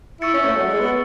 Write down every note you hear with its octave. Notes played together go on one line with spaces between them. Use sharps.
E4 C#6 E6 A6 C#7
C#4
A3
F#3
G#3
B3